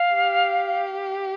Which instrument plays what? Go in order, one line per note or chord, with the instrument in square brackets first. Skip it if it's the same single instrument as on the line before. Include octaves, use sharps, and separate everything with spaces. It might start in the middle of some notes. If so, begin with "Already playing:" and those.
Already playing: [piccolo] F5
[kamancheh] G4